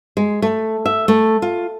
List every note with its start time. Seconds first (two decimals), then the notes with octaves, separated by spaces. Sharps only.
0.17 G#3
0.42 A3
0.86 E5
1.08 A3
1.42 F4